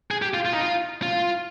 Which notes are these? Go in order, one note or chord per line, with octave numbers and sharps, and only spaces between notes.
G#4
G4
F4
F4
D#4
F4
F4